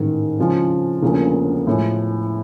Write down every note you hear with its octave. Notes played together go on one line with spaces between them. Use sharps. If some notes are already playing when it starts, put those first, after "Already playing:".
Already playing: A1 G#2 D#3
F2 C#3 F3 G#3
E1 D2 C#3 F3 A#3
A2 F3 G#3